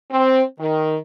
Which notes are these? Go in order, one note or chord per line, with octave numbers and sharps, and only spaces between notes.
C4
D#3